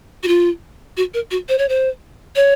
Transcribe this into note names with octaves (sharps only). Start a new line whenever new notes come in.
F#4
F4
F#4
A#4
F#4
C5
C#5
C5
C#5